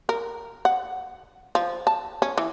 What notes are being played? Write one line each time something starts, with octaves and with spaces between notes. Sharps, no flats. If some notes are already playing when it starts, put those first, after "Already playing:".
A#4
F#5
F3
A5
C#4
E3